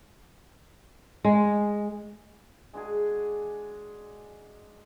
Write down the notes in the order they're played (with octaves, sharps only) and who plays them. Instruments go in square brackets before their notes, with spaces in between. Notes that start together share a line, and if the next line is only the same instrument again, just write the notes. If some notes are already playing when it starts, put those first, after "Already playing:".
[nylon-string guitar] G#3
[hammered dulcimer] G#3 D4 F#4 G#4